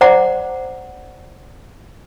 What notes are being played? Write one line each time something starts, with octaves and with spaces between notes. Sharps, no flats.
C5 D5 F#5 A#5 D6